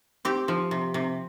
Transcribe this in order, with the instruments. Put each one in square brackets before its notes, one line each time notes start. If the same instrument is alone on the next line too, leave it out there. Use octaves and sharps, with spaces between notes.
[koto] C4 G4
F3
C3
C3